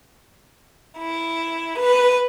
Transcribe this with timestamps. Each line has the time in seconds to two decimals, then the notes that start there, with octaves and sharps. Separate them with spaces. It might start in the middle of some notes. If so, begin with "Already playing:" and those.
0.98 E4
1.79 B4